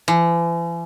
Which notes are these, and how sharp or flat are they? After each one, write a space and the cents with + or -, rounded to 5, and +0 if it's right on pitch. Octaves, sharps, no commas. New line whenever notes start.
E3 +45